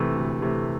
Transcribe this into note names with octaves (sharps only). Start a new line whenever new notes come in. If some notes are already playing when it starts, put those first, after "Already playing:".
Already playing: C3 E3 A3
D2
C3 E3 A3